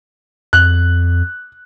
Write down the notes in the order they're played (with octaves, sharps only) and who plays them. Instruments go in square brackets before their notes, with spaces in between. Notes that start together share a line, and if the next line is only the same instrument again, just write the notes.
[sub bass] F2 [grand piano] F#6